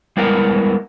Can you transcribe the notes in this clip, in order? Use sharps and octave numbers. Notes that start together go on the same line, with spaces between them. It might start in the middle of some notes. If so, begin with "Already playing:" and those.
G3 G#3 B3 E4 A#4 F#5